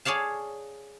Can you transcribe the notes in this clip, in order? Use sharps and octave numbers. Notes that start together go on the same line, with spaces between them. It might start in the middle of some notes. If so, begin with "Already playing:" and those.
G#4 C#5 D5 F5 A5